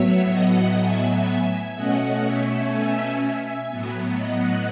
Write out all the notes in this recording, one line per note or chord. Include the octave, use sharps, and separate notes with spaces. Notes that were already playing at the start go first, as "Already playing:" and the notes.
Already playing: A2 F#3 B3 C#5 E5
D#5 F#5
E5 G#5
B2 A3 C#4 D#5 F#5
C#5 E5
E5 G#5
E5 G#5
A2 F#3 B3
D#5 F#5